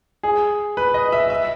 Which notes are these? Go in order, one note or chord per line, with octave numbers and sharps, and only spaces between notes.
G#4
B4
D#5
E5
E5